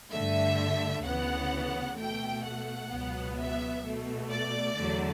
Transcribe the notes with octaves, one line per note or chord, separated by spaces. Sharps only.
G2 D3 A3 E5
D2 C#3 E3 B3 F#5
B2 A3 G5
F#5
C#2 B2 F#3 B3
E5
B2 A3
D5
E2 D3 F#3 A3